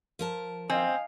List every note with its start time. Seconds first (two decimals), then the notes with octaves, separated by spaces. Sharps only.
0.19 F3 A#4 A5
0.70 C4 D#5 F5 G#5